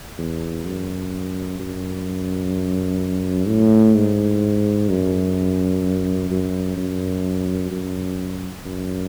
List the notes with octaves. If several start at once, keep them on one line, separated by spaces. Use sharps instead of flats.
E2
F#2
F#2
A2
G#2
F#2
F#2
F#2
F#2
F#2